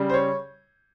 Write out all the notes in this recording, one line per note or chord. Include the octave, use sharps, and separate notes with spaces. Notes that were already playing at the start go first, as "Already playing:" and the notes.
Already playing: C#3 G3
C5
C#5